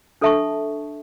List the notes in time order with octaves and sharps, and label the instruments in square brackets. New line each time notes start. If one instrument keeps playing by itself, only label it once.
[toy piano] D4 A4 E5 A5 C#6